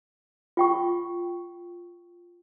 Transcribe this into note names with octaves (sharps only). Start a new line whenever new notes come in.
F4 G5 C#6